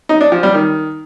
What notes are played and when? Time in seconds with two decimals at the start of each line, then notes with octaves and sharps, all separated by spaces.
0.09 D#4
0.21 D4
0.32 F3
0.43 G3
0.54 D#3